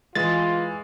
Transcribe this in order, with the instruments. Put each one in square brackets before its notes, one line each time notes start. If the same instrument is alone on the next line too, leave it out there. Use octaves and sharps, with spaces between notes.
[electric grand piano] E3 G#3 [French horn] F4 [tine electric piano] A6